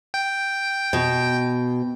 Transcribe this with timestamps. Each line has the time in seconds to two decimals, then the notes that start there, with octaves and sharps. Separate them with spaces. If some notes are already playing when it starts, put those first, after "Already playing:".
0.14 G5
0.93 B2